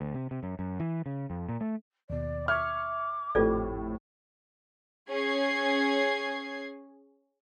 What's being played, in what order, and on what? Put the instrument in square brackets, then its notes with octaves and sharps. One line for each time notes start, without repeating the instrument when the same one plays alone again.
[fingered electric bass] D2
C3
C3
F#2
F#2
E3
C#3
F2
A#2
A3
[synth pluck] D#2 B2 [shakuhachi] D5
[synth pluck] E5 C#6 [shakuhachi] D6 [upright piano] F6 G#6
[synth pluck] G#1 G4 [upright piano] F2 A2 [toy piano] F4 A4 D5
[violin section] C#4 G#4 G#6 C7